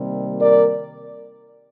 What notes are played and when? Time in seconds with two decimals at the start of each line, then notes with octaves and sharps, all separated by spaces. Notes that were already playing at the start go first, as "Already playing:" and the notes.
Already playing: C3 D#3 G3 A#3
0.40 A#4 D5